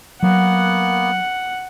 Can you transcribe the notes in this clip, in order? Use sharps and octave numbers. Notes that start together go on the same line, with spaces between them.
F#3 A#3 B3 F#5